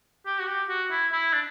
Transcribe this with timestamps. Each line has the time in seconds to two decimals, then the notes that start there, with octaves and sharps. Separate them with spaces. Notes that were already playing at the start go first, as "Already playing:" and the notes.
0.26 G4
0.40 F#4
0.47 G4
0.69 F#4
0.91 E4
1.12 E4
1.33 D4